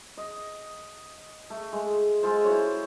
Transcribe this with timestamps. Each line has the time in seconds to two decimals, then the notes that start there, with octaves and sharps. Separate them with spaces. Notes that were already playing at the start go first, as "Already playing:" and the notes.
0.17 D#5
1.50 A3
1.72 G#3
2.23 G#3 F4 A4 C5
2.44 E4 F#4 C5 C#5